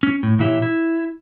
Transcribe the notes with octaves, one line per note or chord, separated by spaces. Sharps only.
C#4
A2
A#2 E3 E4 G4 C#5
E4